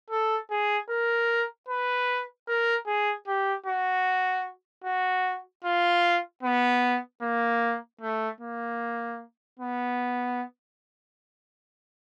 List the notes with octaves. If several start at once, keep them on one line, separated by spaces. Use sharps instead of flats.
A4
G#4
A#4
B4
A#4
G#4
G4
F#4
F#4
F4
B3
A#3
A3
A#3
B3